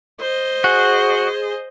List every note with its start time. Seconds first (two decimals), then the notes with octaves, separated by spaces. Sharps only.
0.20 C5 D#5
0.64 F#4 G#4